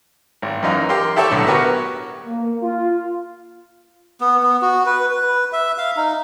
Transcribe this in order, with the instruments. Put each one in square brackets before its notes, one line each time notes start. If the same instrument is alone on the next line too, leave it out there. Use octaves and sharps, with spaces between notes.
[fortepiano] G#1
F#2 E3 D#4 F4
G4 A#4 C6
E4 G4 A4 C#5 E5
B1 A2 D3
B3 F#4 G4 A#4 B4 C#5
[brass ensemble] A#3
F4
[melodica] B3
B3
F#4
B4
B4
E5
F5
D#4